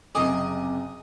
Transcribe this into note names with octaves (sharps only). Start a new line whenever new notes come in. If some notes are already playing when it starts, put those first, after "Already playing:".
F#1 C3 G#4 D#5 D6